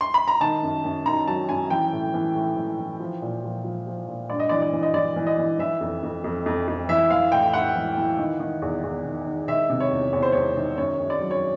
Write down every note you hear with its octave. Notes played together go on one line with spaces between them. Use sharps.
C6
B5
A#5
D#3 A5
F#2
F#2
D#3 A#5
F#3 A5
F#2 G#5
E3 G5
A2
E3
A2
E3
E3
F3
A#2
F3
F3
F3
A#2
G2 D5
D#5
E3 D5
D5
E3
D#5
E3 D5
E3
D#5
E3
E3 E5
F2
F2
F2
F2
F2
E3 E5
E3 F5
A2 G5
A2 F#5
E3
E3
D#3
D#3
E2
E2
D#3
D#3
D#3 E5
C3
C#5
E2
E2 C#5
C5
E2 C#5
D#3
F#2 C#5
F#2
D5
F#3
C#5